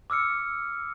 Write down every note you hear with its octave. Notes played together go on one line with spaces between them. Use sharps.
D6 E6 F6 C#7